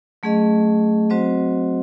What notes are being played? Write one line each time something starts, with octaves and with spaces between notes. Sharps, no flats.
F#3 A3 C#4 G#4 D#5
F#3 C4 F#4 C5 D#5